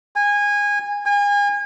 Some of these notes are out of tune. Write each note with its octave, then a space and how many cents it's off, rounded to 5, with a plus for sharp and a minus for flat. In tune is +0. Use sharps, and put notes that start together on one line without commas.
G#5 -20
G#5 -35